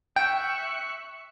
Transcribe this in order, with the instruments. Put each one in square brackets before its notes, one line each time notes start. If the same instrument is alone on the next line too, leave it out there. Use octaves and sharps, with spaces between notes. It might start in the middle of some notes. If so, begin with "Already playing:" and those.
[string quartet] E5 C#6 F#6 [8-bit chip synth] G5